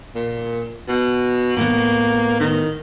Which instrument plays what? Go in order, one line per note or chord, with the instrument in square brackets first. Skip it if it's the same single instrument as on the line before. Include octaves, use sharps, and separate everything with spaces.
[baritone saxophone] A#2
B2
[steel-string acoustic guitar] A2 B3 [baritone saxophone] A#3
[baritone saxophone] D#3